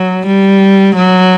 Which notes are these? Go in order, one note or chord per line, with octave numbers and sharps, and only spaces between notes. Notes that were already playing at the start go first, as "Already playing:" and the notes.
Already playing: F#3
G3
F#3